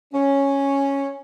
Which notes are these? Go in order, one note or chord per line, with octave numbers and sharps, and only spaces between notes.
C#4